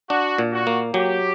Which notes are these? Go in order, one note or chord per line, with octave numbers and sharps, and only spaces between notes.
D4 F#4
A#2
F#4
A#3
F#3 G4